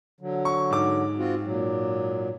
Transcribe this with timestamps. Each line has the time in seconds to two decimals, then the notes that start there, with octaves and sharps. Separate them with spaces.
0.21 D3 F#3
0.45 C#6
0.71 G#2 D6
1.18 C4 F4 F#4
1.44 A#2 F#3